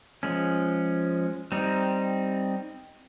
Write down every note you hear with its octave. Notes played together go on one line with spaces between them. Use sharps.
F3 G#3 C#4
G3 C4 D#4